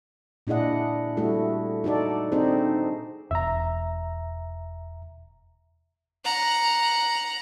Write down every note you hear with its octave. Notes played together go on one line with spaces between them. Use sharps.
A#2 D4 E4 G#4 D#5 F#5
G3 A3 E4 F#4 A4
D#4 F#4 A4 D5
C4 D4 D#4 G#4 C5
E1 E5 A#5
F#5 A#5